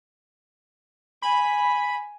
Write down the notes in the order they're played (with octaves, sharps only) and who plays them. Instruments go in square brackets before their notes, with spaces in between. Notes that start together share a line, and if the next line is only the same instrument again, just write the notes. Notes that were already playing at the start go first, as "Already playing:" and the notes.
[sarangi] G#5 [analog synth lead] B5